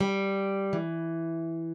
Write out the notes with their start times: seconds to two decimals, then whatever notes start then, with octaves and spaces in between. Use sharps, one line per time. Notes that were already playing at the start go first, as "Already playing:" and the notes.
0.01 G3
0.73 E3